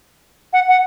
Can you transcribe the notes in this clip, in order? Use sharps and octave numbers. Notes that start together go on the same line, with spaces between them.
F#5
F#5